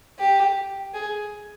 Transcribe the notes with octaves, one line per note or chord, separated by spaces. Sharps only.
G4
G#4